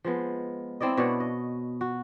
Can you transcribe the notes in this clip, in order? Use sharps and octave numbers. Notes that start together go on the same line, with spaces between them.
F3 G#3 B3
C4 E4 D5 D#5
B2 D4 C#5 F#5
D#5
F#4